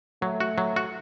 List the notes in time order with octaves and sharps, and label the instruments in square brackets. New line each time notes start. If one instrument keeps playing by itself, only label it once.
[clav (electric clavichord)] F#3 [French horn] A3
[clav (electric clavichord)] F#4
F#3
F#4